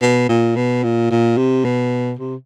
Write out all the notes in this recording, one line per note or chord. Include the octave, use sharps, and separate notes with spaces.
B2
A#2
B2
A#2
A#2
C3
B2
C3